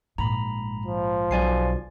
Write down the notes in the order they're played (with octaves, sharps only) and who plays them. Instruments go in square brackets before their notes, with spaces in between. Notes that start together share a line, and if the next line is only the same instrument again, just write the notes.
[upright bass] A#1 G#2 [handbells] A#5 B5
[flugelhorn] F3
[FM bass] B1 [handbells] D5 G#5 C7